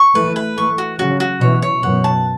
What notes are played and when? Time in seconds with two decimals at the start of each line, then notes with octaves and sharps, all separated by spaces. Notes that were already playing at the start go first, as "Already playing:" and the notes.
Already playing: C#6
0.14 E3 A3 B4
0.36 B4
0.57 E3 A3 C#6
0.78 F#4
0.99 C#3 F#3 F#4
1.20 F#4
1.41 B2 E3 C#5
1.62 C#5
1.83 F#2 B2 F#5
2.04 A5